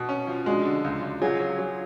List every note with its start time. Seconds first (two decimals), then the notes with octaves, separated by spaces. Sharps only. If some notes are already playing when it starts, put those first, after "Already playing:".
Already playing: B2 F#4
0.09 C#4
0.27 F3
0.46 G#3 D4 F#4
0.65 D3
0.84 C#2
1.02 C#2
1.22 F#3 F4 G#4
1.40 F#3
1.58 F#3